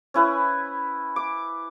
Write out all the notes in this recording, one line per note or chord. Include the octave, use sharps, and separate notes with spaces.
C#4 E4 B4
D6